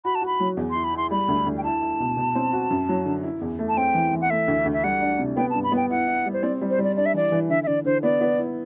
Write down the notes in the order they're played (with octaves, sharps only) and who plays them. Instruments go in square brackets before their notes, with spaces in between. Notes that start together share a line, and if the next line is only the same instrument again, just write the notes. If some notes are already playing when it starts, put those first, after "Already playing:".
[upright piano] F#4 [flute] B5
[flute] A5
[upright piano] F#4 [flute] B5
[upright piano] F#3
E2
[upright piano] E4 [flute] C6
[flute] B5
[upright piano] E4 [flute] C6
[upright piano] G3 [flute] B5
[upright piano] D2
D2
[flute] G5
[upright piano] E4 [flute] A5
[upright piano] E4
B2
B2
C4
F#4
F#2
F#3
D3
E4
E2
A3
[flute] A5
[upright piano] C4 [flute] G5
[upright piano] E3
E3
[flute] F#5
[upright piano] A3 [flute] E5
[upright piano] D2
D2
[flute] E5
[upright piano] G3 [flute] F#5
[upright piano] D4
C3
[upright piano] B3 [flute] G5
[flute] A5
[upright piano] G2
[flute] B5
[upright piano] B3 [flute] G5
[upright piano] E4 [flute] F#5
[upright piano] E4
G3
[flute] C5
[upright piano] C4 [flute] D5
[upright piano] G3
[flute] C5
[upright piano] G3 [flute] D5
[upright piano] D4 [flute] D5
[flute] E5
[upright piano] E3 [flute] D5
[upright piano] E3
[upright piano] D3 [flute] E5
[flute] E5
[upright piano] D3 [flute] D5
[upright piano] D3 [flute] C5
[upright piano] B3 [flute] D5
[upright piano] B3
E4